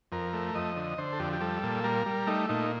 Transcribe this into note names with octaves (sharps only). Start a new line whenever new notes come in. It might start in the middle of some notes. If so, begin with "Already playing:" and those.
F2 A#4
A3
F2 D#5
D3
D3 C5
A4
F2 G4
G4
G3 A4
A#2
G3 A#4
G3
A3 D#4
A#2 D#4